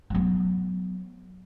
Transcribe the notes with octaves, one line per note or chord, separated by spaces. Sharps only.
F#3 B3